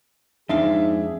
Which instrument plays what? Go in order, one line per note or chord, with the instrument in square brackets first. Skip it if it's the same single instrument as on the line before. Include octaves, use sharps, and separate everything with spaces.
[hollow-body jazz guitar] F2 D4 F5 [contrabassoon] G#2 [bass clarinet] G#4 [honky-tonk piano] E5